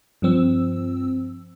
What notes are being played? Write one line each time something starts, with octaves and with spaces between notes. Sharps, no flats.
G2 F3 C4 E6